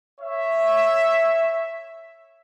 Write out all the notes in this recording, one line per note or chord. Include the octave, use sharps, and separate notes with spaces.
C#5 E5